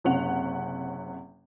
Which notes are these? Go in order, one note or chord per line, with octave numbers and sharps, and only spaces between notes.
F#1 C3 C#4 F#5 F7